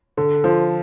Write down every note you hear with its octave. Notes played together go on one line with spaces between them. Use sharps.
D3
F3